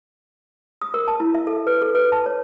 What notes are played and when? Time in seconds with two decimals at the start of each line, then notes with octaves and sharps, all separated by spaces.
0.82 D#6
0.94 A#4
1.08 A5
1.20 E4
1.34 E5
1.47 A4
1.67 B4
1.82 A4
1.95 B4
2.12 A5
2.26 C#5